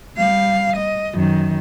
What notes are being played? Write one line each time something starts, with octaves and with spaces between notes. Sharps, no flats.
G3 F5
D#5
F#2 D#3